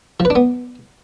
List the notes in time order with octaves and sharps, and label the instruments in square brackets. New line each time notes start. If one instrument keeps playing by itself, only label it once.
[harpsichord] F3
B4
D4
B3